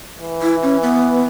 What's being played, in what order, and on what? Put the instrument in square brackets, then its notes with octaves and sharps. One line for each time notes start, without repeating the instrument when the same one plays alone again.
[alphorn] E3
[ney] E4
C#4
B3